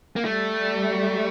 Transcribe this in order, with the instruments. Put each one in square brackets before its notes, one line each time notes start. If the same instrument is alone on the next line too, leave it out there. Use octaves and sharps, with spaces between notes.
[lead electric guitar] A#3
[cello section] G3 [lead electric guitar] A3